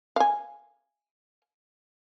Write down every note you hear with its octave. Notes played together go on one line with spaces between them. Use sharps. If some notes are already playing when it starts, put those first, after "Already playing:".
F5 G#5